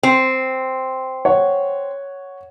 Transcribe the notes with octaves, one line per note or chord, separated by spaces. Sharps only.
C4
C#5 F#5